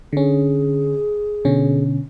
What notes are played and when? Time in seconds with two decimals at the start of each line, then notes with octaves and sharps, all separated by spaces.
0.13 D3 C#4 G#4
1.45 B2 D3 C#4